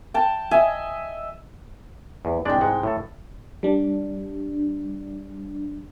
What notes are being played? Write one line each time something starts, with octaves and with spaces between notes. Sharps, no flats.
G5 A5
D#5 E5 G#5
E2
C2 G#3 D4 D5 G5
G#2 G#3 F#5
A2 A4
G3 D4